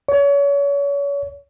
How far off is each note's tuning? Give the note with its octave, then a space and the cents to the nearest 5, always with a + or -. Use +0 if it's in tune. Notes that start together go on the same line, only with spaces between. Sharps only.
C#5 +35